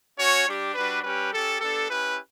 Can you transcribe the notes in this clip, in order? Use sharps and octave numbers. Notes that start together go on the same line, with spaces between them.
C#4 F#4 C#5
G3 D4 G4
G3 D4 F#4 B4
G3 C#4 G4 B4
C#4 G4 A4
B3 D4 G4 A4
C#4 E4 G4 B4